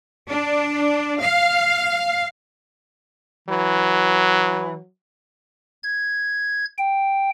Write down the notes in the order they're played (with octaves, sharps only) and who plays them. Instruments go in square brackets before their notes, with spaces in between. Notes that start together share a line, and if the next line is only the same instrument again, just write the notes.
[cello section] D4
F5
[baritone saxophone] E3 [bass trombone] F#3
[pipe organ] G#6
G5